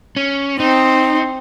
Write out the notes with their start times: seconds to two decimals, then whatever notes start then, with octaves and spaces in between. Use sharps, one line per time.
0.16 C#4
0.60 C4 D#4